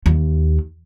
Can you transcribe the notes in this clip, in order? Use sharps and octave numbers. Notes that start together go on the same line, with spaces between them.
D#2